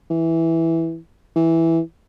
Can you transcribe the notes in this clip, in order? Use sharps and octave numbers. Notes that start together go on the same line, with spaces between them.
E3
E3